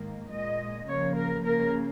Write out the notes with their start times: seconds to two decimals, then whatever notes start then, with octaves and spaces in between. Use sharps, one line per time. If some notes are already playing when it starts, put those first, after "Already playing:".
Already playing: G#2 D#3 A#3
0.30 A#2 G#3 D#5
0.87 C#3 F3 A#3 C#5
1.15 A#4
1.44 C#3 A#3 A#4